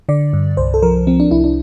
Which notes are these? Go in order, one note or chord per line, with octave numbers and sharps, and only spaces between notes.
D3 D5
G2
C2 C5
A4
F3 A#4
F3 C4
D4
C2 E4
D4